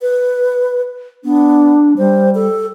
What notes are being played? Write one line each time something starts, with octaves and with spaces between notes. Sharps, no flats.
B4
B3 D4
G3 C5
A4